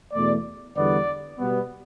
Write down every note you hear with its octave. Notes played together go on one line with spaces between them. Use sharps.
E2 B2 A3 D5
E2 D3 G3 B3 D5
B2 G3 B3